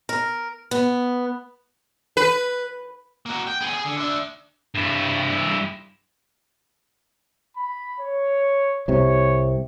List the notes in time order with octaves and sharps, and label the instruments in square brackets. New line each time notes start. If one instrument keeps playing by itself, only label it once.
[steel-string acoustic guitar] A#4
B3
[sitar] B4
[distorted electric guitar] A#3 F#4
G5
B3 G#4
G#4
D3
D4 E5
G2 E4
[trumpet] B5
C#5
[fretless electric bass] C2 C3 [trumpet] C#5